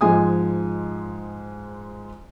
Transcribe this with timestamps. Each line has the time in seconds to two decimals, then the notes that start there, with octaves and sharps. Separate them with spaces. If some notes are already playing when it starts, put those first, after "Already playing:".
0.01 G#2 F3 G#3 G#5 D#6